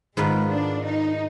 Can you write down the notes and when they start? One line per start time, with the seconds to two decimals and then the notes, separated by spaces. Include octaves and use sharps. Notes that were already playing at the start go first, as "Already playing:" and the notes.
0.17 G#2 D#3 G#3 B3 F4 B4
0.51 D4
0.85 D#4